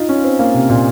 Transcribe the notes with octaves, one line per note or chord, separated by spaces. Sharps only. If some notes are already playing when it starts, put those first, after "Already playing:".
Already playing: D#4 F4
C#4
C4
A#3
C3
A#2